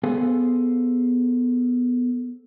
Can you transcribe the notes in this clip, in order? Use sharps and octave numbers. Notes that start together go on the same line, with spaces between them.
B3 G#4 A4 C5 F5 G#5